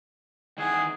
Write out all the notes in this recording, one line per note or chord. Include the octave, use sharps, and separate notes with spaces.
D#3 E3 G#4 F#5